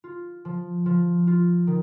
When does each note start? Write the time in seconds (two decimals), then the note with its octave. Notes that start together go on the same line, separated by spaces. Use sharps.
0.04 F4
0.45 F3
0.86 F3
1.27 F4
1.67 D#3